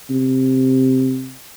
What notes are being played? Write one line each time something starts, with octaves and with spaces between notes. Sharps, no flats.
C3